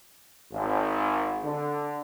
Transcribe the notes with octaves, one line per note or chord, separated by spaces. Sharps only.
G#1
D3